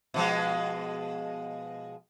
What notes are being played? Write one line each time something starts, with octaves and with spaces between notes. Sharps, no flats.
B2 F3 G#3